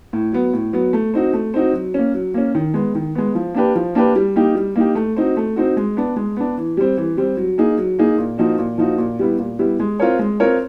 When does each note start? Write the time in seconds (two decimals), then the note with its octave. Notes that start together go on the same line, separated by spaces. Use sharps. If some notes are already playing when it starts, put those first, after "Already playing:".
0.13 A2
0.32 F#3 B3
0.53 A2
0.73 F#3 B3
0.93 A3
1.14 C4 D#4 F#4
1.33 A3
1.54 C4 D#4 F#4
1.73 F#3
1.94 A#3 C#4
2.14 F#3
2.34 A#3 C#4
2.55 D#3
2.74 G#3 B3
2.95 D#3
3.15 G#3 B3
3.35 F3
3.54 A#3 D4 G4 B4
3.75 F3
3.95 A#3 D4 G4 B4
4.16 G3
4.36 A#3 D#4 G4
4.55 G3
4.76 A#3 D#4 G4
4.95 A3
5.17 C4 D#4 F#4
5.37 A3
5.56 C4 D#4 F#4
5.77 G#3
5.97 B3 D4
6.16 G#3
6.37 B3 D4
6.58 E3
6.77 G3 C4
6.97 E3
7.17 G3 C4
7.37 F#3
7.58 A#3 D#4 G#4
7.78 F#3
7.99 A#3 D#4 G#4
8.19 A#2
8.38 F3 A#3 D#4 F#4
8.59 A#2
8.78 F3 A#3 D#4 F#4
8.98 A#2
9.19 G3 B3 E4
9.39 A#2
9.59 G3 B3 E4
9.80 G#3
10.00 C4 F4 A#4 C#5
10.19 G#3
10.40 C4 F4 A#4 C#5